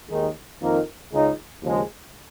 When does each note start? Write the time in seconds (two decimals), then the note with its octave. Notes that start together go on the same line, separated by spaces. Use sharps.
0.10 D#2 D#3 G#3 D#4
0.61 F2 D#3 A#3 D#4 A#4
1.11 C#2 C#3 G#3 D#4
1.62 D#2 C#3 F3 G#3